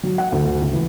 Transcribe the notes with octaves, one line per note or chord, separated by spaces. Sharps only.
F#3
F#5
D2
D2
C#2
E3